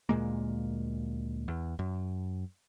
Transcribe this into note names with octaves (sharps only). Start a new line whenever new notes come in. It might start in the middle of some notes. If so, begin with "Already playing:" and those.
D2 A#2 G#3 A#3
E2
F#2